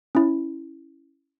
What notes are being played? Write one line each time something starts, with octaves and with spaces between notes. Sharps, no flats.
C#4 E4